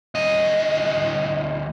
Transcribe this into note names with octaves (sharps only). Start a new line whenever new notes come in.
D2 D#5